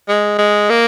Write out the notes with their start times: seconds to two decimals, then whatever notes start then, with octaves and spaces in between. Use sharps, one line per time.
0.08 G#3
0.38 G#3
0.70 A#3